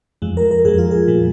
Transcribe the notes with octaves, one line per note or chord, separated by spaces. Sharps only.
F2 F3 G#3
A#4
A#4
F2 F3 G#3 G#4
F4
G#4
A#2 F3 G#3